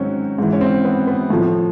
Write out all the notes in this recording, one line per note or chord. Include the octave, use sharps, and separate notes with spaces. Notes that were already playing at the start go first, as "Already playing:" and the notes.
Already playing: G#2 D#3 F#3 C4 C#4
G#2 E3
C#4
C4
B3
B3
A2 F3